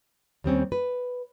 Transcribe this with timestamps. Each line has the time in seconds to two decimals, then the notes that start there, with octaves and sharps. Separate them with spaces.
0.44 D#2 G3 C4 C#4
0.72 B4